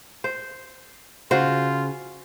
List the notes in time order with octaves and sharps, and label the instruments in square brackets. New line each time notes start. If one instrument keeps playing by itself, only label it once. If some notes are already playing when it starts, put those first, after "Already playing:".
[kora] C5
[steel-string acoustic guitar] C#3 [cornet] F4 [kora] F#4 C5